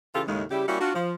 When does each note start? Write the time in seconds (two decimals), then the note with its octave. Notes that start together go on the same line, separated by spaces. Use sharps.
0.14 C#3 E3 F4 G4 A4
0.28 D#2 A2 C#3 G#3
0.50 C#3 G3 E4 G4
0.68 G3 A#3 C#4 E4 F#4
0.80 D4 F4 F#4
0.94 F3